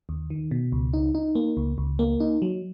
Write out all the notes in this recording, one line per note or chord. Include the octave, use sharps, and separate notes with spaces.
D#2
D#3
B2
C#2
D#4
D#4
A#3
C#2
C#2
A#3
D#4
F#3